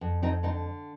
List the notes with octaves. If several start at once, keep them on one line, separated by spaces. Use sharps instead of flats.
F2
F2 C4 D#4
D3 C4 D#4